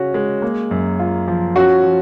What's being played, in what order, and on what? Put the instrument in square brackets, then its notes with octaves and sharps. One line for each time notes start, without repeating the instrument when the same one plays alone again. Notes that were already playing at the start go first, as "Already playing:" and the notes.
Already playing: [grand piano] C#3 C#4 F#4
G#3
A#3
F#2
F4
F3
[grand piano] C#4 [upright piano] F#4
[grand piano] F3